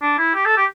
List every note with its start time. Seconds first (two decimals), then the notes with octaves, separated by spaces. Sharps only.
0.02 D4
0.18 E4
0.35 G4
0.45 A4
0.57 G4